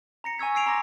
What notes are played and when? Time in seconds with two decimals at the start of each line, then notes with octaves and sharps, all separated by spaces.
0.24 A#5 A#6 C#7
0.38 G#5 C#6 E6 G#6 B6
0.55 E6 G#6 C7 D7 F7
0.66 A#5 C6 D6 A#6